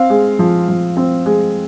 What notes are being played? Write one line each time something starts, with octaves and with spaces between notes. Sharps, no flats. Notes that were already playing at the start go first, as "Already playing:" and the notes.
Already playing: C4 F5
G#3
F3
F3
C4
G#3